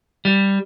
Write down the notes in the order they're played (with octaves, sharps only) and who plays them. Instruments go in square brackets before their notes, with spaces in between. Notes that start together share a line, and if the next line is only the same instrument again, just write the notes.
[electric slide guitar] G3